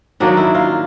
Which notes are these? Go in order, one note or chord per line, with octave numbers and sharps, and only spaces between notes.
D#3 F#3 A#3 D4
E4
F4